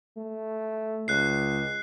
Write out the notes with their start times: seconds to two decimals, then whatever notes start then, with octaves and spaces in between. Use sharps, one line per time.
0.17 A3
1.08 C#2 F#6 C7